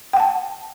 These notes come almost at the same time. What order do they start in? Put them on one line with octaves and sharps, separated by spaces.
G5 F#5 A5